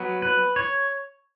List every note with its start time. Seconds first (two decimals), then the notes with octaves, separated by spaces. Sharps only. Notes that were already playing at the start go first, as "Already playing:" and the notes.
Already playing: F#3 B3
0.22 B4
0.56 C#5